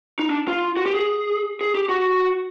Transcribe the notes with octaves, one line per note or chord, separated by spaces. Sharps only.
D#4
D4
F4
F#4
G4
G#4
G#4
G4
F#4